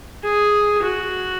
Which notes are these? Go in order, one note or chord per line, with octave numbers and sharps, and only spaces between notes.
G#4
F#4